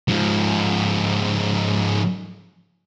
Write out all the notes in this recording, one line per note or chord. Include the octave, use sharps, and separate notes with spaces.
G#2 F3